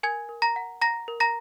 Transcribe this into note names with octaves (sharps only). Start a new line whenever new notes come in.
A#4 G#5 G#6
A#4
A#5 A#6
F#5
F#5 A#5 A#6
A#4
A#5 A#6